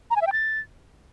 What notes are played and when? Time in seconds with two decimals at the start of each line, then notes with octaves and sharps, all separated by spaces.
0.11 A#5
0.16 G#5
0.21 E5
0.27 G5
0.32 A6